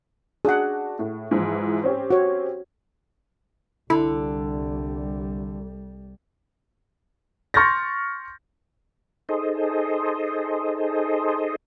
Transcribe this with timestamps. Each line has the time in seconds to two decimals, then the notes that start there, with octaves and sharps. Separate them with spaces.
0.45 D4 F#4 G#4 F#5
0.99 A2
1.31 G#2 E3 F3
1.84 C4 C#4 G4
2.10 F#4 C#5
3.90 C2 D3 G3 E4
7.54 C6 C#6 F6 G6 A6 A#6
9.29 D#4 G#4 A4 C5 D#5